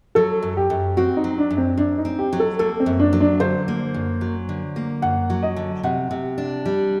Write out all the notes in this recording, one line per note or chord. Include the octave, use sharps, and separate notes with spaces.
F#3 A4
F#2
G4
F#2
C4 F#4
D#4
F#3
D4
F#2
C4
F#2 D4
D#4
C4
G4
F#3
A4
A#3 A4
C4
F#2
D4
F#3
D4
D3 C5
A#3
F#2
F#3
D3
A#3
F#2 F#5
F#3
D#5
D3
C3 F#5
C3
D4
G3